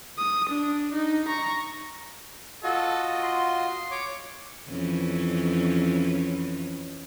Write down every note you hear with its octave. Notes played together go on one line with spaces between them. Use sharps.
D#6
D4
D#4
A#5 C#6
F4 F#4 A4 D#5
C6
C#5 D6
F2 E3 C#4